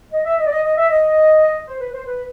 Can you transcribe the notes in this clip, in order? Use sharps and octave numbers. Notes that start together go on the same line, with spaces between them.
D#5
E5
D#5
D5
D#5
D#5
E5
D#5
C5
B4
C5
B4